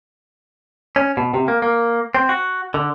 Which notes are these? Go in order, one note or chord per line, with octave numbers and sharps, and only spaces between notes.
C#4
B2
C3
A#3
A#3
C4
F#4
D3